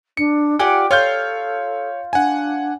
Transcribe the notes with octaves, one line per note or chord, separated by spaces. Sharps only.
D4 C#7
F4 G4 D5 F#5 G#5
F4 A4 C#5 F6 G6
D4 F#5 G#5